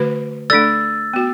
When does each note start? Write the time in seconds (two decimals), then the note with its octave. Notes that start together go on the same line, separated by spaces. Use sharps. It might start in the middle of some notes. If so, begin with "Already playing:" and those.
Already playing: D3 A3 F#4 B4
0.50 A3 D4 A4 D5 E6 A6
1.13 B3 F#4